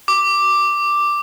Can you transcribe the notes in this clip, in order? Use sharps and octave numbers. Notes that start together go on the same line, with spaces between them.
D6